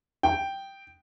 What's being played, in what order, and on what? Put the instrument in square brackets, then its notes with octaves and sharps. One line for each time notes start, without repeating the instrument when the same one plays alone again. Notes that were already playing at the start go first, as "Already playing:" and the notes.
[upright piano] G5